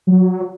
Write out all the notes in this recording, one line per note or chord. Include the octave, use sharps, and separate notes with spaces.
F#3